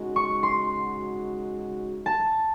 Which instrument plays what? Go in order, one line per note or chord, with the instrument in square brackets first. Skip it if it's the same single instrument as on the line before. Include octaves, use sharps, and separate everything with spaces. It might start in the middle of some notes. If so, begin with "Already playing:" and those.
Already playing: [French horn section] C#3 G#3 D#4 F#4
[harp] C#6
C6
A5